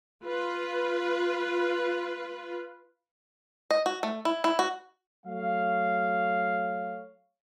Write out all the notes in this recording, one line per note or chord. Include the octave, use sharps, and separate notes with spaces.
F4 B4
D#5
F#4
A3
E4
E4
F#4
F#3 A3 C#5 F5